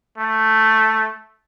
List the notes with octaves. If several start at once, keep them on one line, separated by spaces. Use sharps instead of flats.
A3